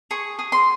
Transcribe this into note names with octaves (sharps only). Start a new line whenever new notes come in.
G#4 C#6
G#4
C6